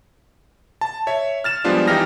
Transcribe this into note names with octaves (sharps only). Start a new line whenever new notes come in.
A5
C#5 E5
F6 A6 E7
F3 G3 G#3 B3 D4 F4
G#1 E3 D#4 G4 F6 A#6